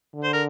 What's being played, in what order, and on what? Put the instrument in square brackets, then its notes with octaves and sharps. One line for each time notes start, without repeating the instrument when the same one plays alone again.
[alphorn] D3
[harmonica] C5
A#4